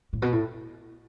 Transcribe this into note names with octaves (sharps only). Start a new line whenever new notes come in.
A2
B2
A2